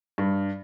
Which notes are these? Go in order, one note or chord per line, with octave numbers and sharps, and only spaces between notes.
G2